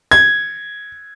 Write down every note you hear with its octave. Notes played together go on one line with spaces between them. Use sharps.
G#6